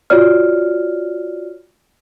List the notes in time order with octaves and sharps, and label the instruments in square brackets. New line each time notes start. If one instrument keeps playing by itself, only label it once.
[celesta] F4 F#4 C#5 D5 F6